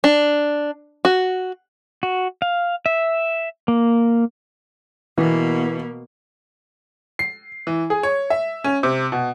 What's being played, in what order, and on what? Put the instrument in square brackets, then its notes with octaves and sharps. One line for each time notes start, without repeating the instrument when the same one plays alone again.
[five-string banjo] D4
F#4
[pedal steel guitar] F#4
F5
E5
A#3
[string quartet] B2 A#3 [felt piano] E3 B3
[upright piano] C7
E3
G#4
C#5
E5
C#4
C3
B2